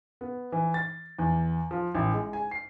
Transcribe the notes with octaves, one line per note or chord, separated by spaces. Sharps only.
B3
E3
A6
E2
F3
A1
G#3
G#5
C7